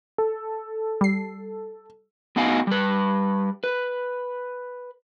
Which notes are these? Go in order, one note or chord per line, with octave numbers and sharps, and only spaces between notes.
A4
G3 C7
A2 B3 D#4 F#4 F5 G#5
G3 B4
B4